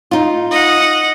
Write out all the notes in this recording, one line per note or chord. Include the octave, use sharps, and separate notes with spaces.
D#4 F4
D#5 F#5